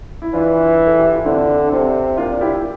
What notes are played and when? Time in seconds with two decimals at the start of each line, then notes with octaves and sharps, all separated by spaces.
0.22 E4
0.33 E3 D4 F4
0.87 A4
0.99 G4
1.12 F4
1.25 D3 C4 E4
1.49 D4
1.68 D4
1.72 C3 C4
2.17 A#2 D4 F4
2.41 E4 G4